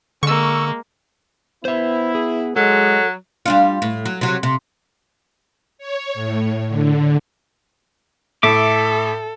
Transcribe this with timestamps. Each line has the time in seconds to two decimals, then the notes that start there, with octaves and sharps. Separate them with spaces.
0.23 D3 G#3 A#3 C#6 E6
1.65 B3 E4 C5 E5
2.15 G#4
2.56 F#3 G#3 A4
3.46 G3 D4 F4
3.82 A2
4.05 F#3
4.21 C3 F#3
4.43 C3
5.78 C#5
6.14 A2
6.68 D3
8.43 A2 A4 E5 D6